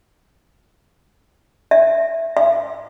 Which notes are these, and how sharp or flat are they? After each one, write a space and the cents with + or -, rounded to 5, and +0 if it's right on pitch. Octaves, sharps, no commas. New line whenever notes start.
E5 +5
E5 +35